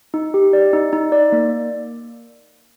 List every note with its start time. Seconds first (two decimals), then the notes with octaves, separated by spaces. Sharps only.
0.14 D#4
0.34 G4
0.53 D5
0.73 D#4
0.93 D#4
1.12 D5
1.32 A#3